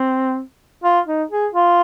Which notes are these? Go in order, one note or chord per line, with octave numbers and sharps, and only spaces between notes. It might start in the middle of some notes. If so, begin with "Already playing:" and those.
Already playing: C4
F4
D#4
G#4
F4